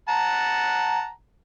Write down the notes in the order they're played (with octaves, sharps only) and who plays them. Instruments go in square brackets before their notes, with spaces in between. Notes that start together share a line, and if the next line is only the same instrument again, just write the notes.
[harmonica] F#5 A5 A#5